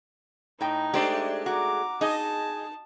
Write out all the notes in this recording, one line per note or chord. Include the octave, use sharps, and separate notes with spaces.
A2 D#4 G5
G#3 A3 D4 G4 C5 D5
F#4 A#5 D6
D#4 G#4 D#5 A5